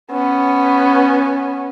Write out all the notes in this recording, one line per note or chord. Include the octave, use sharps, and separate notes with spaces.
B3 C#4